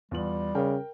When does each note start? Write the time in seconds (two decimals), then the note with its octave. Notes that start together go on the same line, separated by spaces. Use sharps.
0.11 E2 G3 F4 F#7
0.55 C#3 A#4 G5